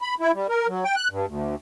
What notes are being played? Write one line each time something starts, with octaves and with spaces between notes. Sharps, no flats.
B5
E4
G3
A#4
F#3
G5
F#6
G2
D2